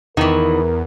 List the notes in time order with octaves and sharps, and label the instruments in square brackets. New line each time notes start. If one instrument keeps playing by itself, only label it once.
[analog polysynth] E2 [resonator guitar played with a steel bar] D#3 E3 [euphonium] A#4